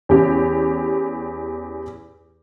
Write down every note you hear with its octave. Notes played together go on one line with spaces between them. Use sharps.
E2 C#4 G4